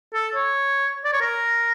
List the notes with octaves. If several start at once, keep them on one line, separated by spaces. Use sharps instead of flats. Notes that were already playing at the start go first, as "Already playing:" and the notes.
A4
C#5
D5
C#5
A#4